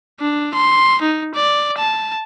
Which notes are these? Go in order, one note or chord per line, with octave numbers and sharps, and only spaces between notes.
D4
C6
D#4
D5
A5